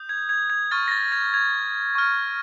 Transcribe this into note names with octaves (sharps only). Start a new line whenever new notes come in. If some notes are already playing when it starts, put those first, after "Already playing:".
Already playing: D#6 G6
G#6
G#6
G#6
C#6 F6 A6
A#6
A6
G#6
G#6
C#6 F6